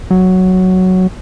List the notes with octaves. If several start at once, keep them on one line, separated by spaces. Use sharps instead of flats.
F#3